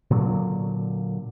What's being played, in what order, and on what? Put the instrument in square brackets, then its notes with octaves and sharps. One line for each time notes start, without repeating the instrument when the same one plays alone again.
[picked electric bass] A#2 D3 F#3